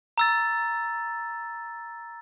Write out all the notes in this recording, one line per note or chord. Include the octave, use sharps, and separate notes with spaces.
A#5 E6 A6